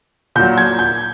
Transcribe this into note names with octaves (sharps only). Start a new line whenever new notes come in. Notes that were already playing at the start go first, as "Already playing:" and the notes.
A#2 F#3 G6
G#6
G6